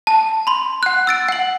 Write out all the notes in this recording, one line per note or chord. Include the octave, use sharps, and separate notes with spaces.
A5
B5 C6
F#5 F#6
E6 A6 D7
F#5 F#7